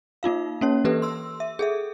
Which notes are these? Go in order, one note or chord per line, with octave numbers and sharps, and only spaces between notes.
A#3 D#4 F4 F5
A#3 C#4 C#5
E3 A#3 G4 A4 B4
C6 E6
E5
G#4 A4 E5